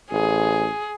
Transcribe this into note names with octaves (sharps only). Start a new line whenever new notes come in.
A1 G#4